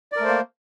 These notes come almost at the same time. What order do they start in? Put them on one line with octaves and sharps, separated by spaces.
D5 A#4 A3 C5 A#3